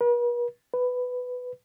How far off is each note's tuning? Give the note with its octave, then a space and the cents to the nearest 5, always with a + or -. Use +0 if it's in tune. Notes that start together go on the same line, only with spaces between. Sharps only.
B4 -45
B4 +10